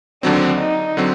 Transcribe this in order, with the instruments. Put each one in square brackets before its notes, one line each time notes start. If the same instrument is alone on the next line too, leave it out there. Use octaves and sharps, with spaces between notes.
[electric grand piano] D#2 D3 F#3 C4 [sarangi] D4
[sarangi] D#4
[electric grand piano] D3 F#3 C4